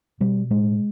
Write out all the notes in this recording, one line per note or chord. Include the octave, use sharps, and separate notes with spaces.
B2 G3
A2 G#3